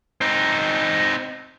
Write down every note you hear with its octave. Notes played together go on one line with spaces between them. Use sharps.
C4 D#4